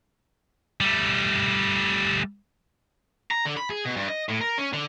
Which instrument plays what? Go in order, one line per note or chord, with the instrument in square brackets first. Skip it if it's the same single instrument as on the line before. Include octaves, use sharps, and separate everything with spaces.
[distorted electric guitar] G3 A3
A#5
D3
B5
G#4
B2
G2
D#5
A2
A#4
C#4
D3